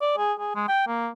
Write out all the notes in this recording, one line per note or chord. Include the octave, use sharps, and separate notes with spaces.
D5
G#4
G#4
G#3
G5
A#3